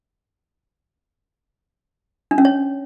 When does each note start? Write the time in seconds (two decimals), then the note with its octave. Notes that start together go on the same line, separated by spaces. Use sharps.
2.31 D4
2.38 C#4
2.45 C#5